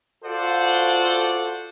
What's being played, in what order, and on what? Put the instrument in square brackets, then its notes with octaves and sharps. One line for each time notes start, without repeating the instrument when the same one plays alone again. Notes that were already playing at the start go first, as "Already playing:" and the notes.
[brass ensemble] F4 F#4 A4 C5 D5 F#5